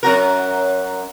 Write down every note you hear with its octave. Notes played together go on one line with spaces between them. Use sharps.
F#2 F#4 A#4